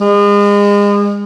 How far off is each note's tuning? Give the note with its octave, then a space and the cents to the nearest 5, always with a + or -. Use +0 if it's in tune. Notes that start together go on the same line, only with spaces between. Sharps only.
G#3 -35